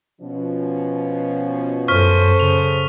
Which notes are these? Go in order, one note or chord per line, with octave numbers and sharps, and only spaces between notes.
B2 F3 C#4
F#2 A4 C5 C#6 F6 B6
C#3 F7